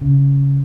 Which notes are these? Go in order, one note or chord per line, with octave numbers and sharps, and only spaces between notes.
C#3